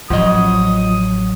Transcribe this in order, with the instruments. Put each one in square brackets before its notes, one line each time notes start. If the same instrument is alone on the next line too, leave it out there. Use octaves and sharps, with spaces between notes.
[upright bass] A1 [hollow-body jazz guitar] F3 D#5 [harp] F#3 [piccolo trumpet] D#6